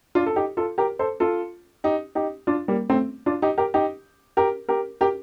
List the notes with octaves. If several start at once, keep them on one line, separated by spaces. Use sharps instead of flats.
D4 F4
A4
D#4 G4
F4 A4
G4 A#4
A4 C5
F4 A4
D#4 G4
D#4 G4
D4 F4
G3 A#3
A3 C4
D4 F4
D#4 G4
G4 A#4
D#4 G4
G4 A#4
G4 A#4
G4 A#4